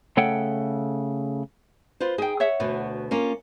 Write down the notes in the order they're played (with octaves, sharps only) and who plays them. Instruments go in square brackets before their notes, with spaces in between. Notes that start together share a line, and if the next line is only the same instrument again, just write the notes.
[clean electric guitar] C#3 A3 A4 C#5 F#5 G5
[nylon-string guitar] F4 B4 C5
[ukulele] D#4 G5 [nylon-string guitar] G#4
[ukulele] C#5 E5 F#5
[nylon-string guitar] D2 B2 B3
A#3 C#4 F4